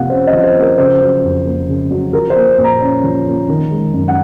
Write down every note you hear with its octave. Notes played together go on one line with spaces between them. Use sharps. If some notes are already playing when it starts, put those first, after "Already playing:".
Already playing: C3 F3 A#3 F5 F#5
C#4 C5
D#5
F3
C5
A#3
A#4
C#3 C5
F#3
F2
A#3
C#3
F#3
F3 A#4
C5
A#3
A#2
A#5
C#4
F3
A#3
D#3
G#3
F#2
F#5